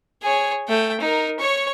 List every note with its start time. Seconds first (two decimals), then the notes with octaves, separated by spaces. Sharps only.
0.22 G#4 C#5
0.68 A3 G5
1.00 D#4 A#4
1.40 C#5 C#6